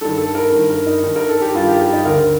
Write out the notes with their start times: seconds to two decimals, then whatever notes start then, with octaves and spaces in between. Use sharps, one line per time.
0.01 G2 D#3 A4
0.18 A4
0.35 A#4
0.52 G2 D#3
0.70 A#4
0.86 D#4
1.03 G2 D#3
1.16 A#4
1.29 A4
1.42 G4
1.54 G2 F4
1.59 D#3
1.67 G4
1.80 G4
1.93 D#4
2.05 D2 D3 A#4